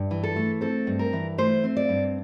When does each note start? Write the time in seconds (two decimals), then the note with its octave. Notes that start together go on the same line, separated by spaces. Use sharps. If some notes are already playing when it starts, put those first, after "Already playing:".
Already playing: G2
0.11 E3
0.23 A4
0.36 A3
0.61 C4 A4
0.87 G2
0.99 A#4
1.13 E3
1.38 A3 C5
1.64 C4
1.77 D5
1.89 G2